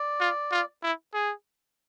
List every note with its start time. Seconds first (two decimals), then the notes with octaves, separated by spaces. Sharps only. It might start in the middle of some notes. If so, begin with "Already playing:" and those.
Already playing: D5
0.21 F4
0.52 F4
0.83 E4
1.14 G#4